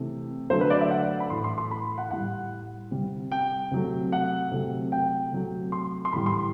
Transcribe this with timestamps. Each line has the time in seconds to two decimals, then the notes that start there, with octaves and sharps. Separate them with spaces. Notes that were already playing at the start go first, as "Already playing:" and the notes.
Already playing: C3 E3 A3
0.50 D3 F#3 A3 C5
0.61 B4
0.70 D5
0.81 E5
0.91 F#5
1.20 B5
1.30 A2 E3 A3 C6
1.44 C6
1.58 C6
1.71 B5
1.98 F#5
2.11 A2 G3 F#5
2.91 C3 G3
3.32 G5
3.71 C3 F#3 A3
4.12 F#5
4.52 C3 F#3 A3
4.92 G5
5.32 C3 F#3 A3
5.72 C6
6.05 C6
6.13 A2 E3 G3 B5
6.26 C6